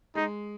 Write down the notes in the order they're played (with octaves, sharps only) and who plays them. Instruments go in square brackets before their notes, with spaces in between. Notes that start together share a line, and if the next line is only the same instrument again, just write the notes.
[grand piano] G#3 [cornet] D#4